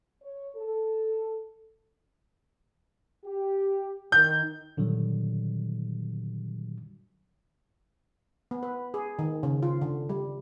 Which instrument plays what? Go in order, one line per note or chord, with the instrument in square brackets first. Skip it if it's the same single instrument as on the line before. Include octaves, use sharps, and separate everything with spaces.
[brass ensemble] C#5
A4
G4
[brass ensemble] D#3 [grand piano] G6
[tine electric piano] A#2 D3 D#3 F#3 G3
[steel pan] B3
B4
G#4
D#3
C#3
F4
D3
G3